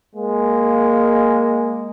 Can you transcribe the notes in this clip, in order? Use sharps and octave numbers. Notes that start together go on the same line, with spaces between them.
G#3 A#3